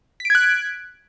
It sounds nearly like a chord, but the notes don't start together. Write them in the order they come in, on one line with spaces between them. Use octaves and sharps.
B6 D7 G#6 F#6